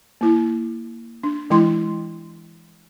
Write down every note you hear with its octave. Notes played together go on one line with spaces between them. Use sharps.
A#3 E4
D4
E3 G#3 E4 C6